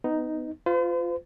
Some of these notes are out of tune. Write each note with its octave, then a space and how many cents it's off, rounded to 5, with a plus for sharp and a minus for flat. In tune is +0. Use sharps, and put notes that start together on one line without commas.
B3 +25 D#4 +0
F4 +0 C5 -45